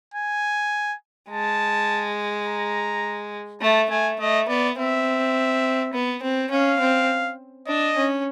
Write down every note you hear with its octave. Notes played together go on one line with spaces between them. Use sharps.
G#5
G#3 A5
A#5
A3 A5
A3 G#5
A3 D#5
B3 D5
C4 E5
B3
C4
C#4 F5
C4
D4 D#5
C#4